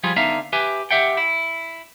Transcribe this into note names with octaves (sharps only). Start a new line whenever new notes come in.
F3 G3 F4 G#4
D3 B3 D#4 E5 F5
G4 B4 E5 G#5
G4 E5 F#5 G5
E4